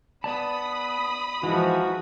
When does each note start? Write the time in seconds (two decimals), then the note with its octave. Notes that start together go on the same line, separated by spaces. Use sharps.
0.24 B3 D5 A5 B5 D#6
1.43 G#2 E3 F3 D#4 F#4